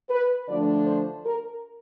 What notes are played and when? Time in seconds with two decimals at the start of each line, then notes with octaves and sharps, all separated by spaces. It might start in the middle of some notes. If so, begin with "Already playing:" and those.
0.10 B4
0.48 D3 F3 A3 D4 D5
0.87 C5
1.26 A#4